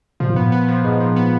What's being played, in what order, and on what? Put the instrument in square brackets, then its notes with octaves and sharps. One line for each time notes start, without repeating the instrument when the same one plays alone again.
[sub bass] A#2 [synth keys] F3
[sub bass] G#2
[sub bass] A#2 [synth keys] B3
[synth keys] B3
F3
G#2
F3
B3